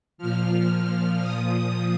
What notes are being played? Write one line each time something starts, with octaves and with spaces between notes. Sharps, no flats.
A#2 F3 F6
A#2 F3 D#6